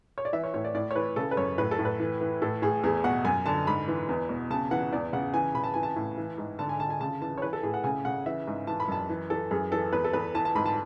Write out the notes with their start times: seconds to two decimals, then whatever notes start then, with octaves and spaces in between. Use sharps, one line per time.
0.18 C#5
0.25 D5
0.33 E3 E5
0.44 C#5
0.54 A2 C#5
0.64 D5
0.75 A2 D5
0.91 C#5
0.96 E3 B4
1.16 C#3 A4
1.31 B4
1.37 F#2 C#5
1.58 A2 B4
1.71 A4
1.79 A2
1.85 B4
2.00 E3
2.21 E3
2.42 A2 A4
2.62 A2 G#4
2.84 E2 G#4
3.04 B2 F#5
3.25 F#2 G#5
3.46 D3 A5
3.67 G#2 B5
3.88 E3
4.09 E2
4.29 B2
4.50 C#3 A5
4.71 E3 F#5
4.93 E2 D5
5.13 C#3 F#5
5.34 E3 G#5
5.55 C#3 B5
5.64 A5
5.74 E3 G#5
5.83 A5
5.96 A2
6.18 E3
6.38 G#2
6.59 D3 A5
6.69 G#5
6.80 D3 A5
6.90 G#5
7.01 C#3 A5
7.22 E3 A5
7.38 C#5
7.42 E3 B4
7.53 A4
7.63 A2 G#4
7.74 F#5
7.84 C#3 G#5
8.05 C#3 F#5
8.26 E3 E5
8.47 G#2
8.67 E3 A5
8.80 B5
8.88 F#2 A5
9.09 E3
9.30 E3 A4
9.51 F#2 G#4
9.72 E3 A4
9.92 E2 B4
10.04 A4
10.13 E2 B4
10.34 E3 A5
10.45 A5
10.55 G#2 B5
10.66 A5